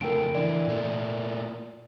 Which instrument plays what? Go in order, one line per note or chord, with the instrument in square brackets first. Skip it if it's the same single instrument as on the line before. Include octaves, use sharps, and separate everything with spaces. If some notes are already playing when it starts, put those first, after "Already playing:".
[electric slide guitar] F2 C#3 A3 [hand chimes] A#4 G5 D7
[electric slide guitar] D3 E3 [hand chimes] D5
[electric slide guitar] A#2 A3 A#3